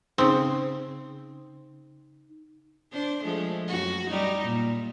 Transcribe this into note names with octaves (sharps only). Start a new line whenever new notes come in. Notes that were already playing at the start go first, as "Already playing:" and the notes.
C#3 C4 D#4
D4 C5
F3 G#3 A3
F#2 F#4
G3 D#4
A#2